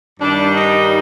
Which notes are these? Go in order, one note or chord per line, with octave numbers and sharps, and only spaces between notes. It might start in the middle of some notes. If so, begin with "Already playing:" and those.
G2 D#3 G3 D4
D#4